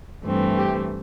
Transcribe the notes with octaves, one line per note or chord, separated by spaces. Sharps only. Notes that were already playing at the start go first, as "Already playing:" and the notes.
G2 E3 A3 C4
G4